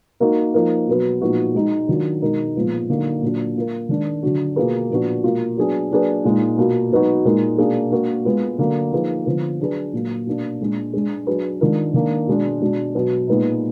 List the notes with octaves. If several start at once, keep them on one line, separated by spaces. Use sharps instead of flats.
A#3 D#4 F#4 A#4
F3 A#3 D#4 A#4
B2 F#3 B3
A#2 F3 B3 D#4 F#4
G#3 D#4 F#4
D#3 F#3 D4 F4
B2 G#3 D#4 A#4
A#2 F3 G#3 B3 F4
D3 F#3 A#3 D#4
A#2 F#3 D4
A#3 F4 A#4
D#3 G#3 D4
D3 F#3 D4 F#4
B2 A#3 F4 G#4 B4
A#2 F3 B3 D4 F#4
B2 A#3 F4
F#3 B3 D4 G#4
F#3 A#3 D4 G#4 B4
A#2 G#3 D#4
B2 A#3 F4
B2 F#3 B3 D#4 F#4
A#2 G#3 D#4 A#4
B2 A#3 D4 G#4
A#3 D4 F#4 A#4
G#3 B3 F4
D3 F#3 A#3
F3 A#3 D#4 G#4 B4
D3 F3 B3
F#3 D4 G#4 B4
A#2 F#3 A#3
B2 A#3 D4
A#2 G#3 D4
G#3 D4 G#4
F#3 D4 G#4 B4
D#3 G#3 D4 F4 A#4
D#3 A#3 D4
B2 G#3 D4
B2 G#3 D4
B2 F#3 B3
A#2 G#3 B3 D#4